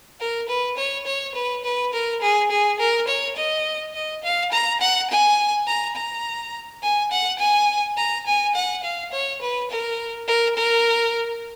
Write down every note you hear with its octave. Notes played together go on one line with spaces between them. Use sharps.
A#4
B4
C#5
C#5
B4
B4
A#4
G#4
G#4
A#4
C#5
D#5
D#5
F5
A#5
F#5
G#5
A#5
A#5
G#5
F#5
G#5
A#5
G#5
F#5
F5
C#5
B4
A#4
A#4
A#4